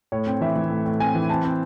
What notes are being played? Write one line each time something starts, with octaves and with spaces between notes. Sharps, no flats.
A2 C#5
C4
E3 E5
E3
A2
A2
C4 G#5
E3
C4 A5
C4